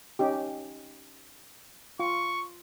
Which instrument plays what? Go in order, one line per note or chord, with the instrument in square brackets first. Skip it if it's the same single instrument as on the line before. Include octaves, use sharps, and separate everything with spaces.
[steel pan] C#4 D#4 G4
[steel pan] F4 [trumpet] C#6